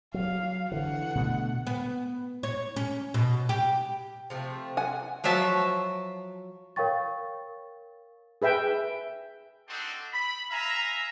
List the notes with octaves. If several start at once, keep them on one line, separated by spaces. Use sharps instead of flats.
F#3 F5
D3 E3 F#5
B2 D3 A3
B3
C#5
C#4
B2
G4
C3 F3 A3
F#5 G#5
F3 F#3 F#4 E5 A5
A#4 C#5 F5 G5 C#6 A6
G#4 B4 E5 G5
C4 D4 D#4 F#4 A4 C5
B5
E5 F5 G#5 A#5